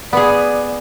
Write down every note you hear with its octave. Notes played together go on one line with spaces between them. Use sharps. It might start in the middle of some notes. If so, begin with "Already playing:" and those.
B3 G#4 D5